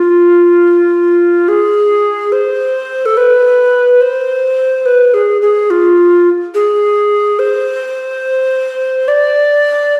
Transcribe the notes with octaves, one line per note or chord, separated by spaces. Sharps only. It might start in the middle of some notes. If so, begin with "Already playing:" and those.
Already playing: F4
G#4
C5
A4
B4
C5
B4
G#4
G#4
F4
G#4
C5
D5